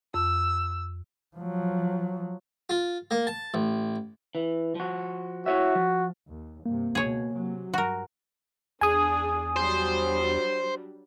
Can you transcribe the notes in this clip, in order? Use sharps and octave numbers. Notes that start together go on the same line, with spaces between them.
F2 E6
F3 F#3
F4
A#3
A5
A1
E3
F3 F#4
E4 F#4 C#5 E5
F3
D#2
G2 C3 A#3
C#2 B2 G#4 C#5
C3 F#3
G2 F#4 A#4
E2 D4 G#4 G#5 D#6
F#3 G3 D4 C5